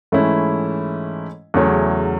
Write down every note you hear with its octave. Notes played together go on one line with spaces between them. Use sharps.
G#2 E3 A3 C#4 E4
E2 C#3 F#3 A3 C#4